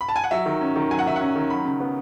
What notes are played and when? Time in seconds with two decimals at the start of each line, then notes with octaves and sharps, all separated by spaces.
0.01 B5
0.09 A5
0.16 G#5
0.24 F#5
0.31 F#3 E5
0.46 D#3
0.61 C#4
0.76 D#3
0.91 F#3 G#5
0.99 F#5
1.06 D#3 E5
1.16 C#4 F#5
1.36 D#3
1.50 F#3 B5
1.65 C#3
1.80 B3